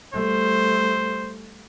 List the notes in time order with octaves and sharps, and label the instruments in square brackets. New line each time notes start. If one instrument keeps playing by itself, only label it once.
[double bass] G3 A3 [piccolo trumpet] C5